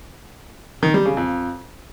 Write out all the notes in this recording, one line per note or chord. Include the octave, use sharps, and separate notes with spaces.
D#3
G3
C#3
F2